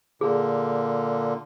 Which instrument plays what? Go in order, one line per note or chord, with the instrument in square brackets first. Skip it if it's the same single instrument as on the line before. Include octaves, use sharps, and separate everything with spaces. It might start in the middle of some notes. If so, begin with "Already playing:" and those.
[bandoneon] A#2 D3 [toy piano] G#4